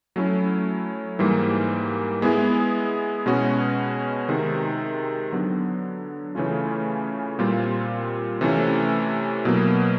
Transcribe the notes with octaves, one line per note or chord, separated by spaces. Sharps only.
F#3 A3 C#4 E4
G#2 E3 G3 A#3
G#3 B3 E4 G#4
B2 G#3 C#4 F#4
C3 D#3 G#3
D3 F#3 B3
C#3 E3 A3 C#4 F4
A#2 G3 C4 F4
C3 E3 A3 C#4
B2 F#3 A#3